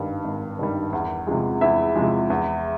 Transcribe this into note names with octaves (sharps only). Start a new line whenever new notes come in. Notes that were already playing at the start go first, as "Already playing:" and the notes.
Already playing: G#1 G2 D#3 G3 F5
G#1
G2 D#3 G3
E2
C3 F3 G#3
E2 E4 E5
C3 F3 G#3
E2